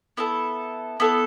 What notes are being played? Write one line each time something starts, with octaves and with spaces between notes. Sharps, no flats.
B3 E4 A4
B3 E4 A4